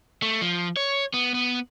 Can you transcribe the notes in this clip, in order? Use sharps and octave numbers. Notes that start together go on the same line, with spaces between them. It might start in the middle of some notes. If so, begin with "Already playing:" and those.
A3
F3
C#5
B3
B3